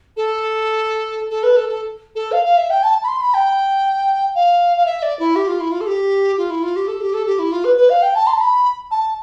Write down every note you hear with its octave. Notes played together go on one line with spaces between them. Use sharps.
A4
A4
B4
A4
A4
A4
F5
F5
E5
G5
A5
B5
C6
B5
G5
F5
F5
E5
D5
E4
G4
F4
E4
F4
A4
G4
F4
E4
F4
G4
A4
G4
A4
G4
E4
F4
B4
B4
F5
G5
A5
C6
A5
B5
A5